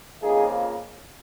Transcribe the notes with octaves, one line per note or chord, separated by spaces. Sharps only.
F2 C#3 F3 A#3 D#4 G#4